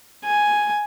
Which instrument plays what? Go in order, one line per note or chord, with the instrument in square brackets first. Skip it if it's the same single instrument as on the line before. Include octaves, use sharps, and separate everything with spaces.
[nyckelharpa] G#5